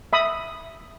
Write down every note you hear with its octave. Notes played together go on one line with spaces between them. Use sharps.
E5 B5 D#6